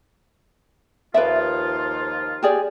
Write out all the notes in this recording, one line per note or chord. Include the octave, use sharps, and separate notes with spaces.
D#2 F3 F4 B4 D5 E5
G4 G#4 D5